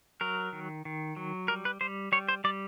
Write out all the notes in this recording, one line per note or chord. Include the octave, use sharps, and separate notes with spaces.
F#3 A#4
D#3
D#3
F#3
G3 A#4
B4
G3 C5
G3 C#5
C5
G3 D5